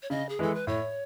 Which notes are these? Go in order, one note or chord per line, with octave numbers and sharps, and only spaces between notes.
C#5
C#3 D#5
G#4
E3 G#3 A4
B4
A2 C#5